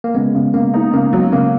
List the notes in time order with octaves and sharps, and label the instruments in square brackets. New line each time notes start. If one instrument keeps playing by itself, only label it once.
[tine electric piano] A#3
[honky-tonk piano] C#3 [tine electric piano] G#3 B3
[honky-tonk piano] C#3
[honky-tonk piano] C#3 [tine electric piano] A#3
[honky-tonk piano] D#4
[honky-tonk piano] C#3 [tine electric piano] A#3
[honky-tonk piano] F#3
[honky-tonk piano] C#3 [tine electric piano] A#3